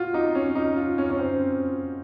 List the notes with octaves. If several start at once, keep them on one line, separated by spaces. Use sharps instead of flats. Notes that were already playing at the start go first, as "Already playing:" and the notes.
Already playing: A#2 F4 F#4
D#4
C#4
D#4
F4
C#4
C#4
C4